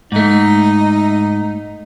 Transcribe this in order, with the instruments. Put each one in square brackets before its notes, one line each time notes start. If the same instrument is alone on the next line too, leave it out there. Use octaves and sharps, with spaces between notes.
[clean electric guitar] G#2 A3 [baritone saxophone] D#4